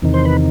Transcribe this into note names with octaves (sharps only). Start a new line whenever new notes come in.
E2 C3 D#3
C5
B4